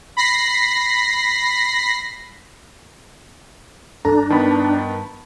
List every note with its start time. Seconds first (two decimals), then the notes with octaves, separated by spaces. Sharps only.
0.17 B5 A#6 C7
4.05 G2 D4 A4 A#5
4.30 D#3 B3 A5 B5